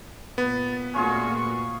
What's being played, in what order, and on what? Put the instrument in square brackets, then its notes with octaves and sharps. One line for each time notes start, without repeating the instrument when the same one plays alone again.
[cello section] A#2 [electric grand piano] B3 [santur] B4 [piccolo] A6
[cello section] A#2 A3 F#4 [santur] C#4 F4 G#4 [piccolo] C#6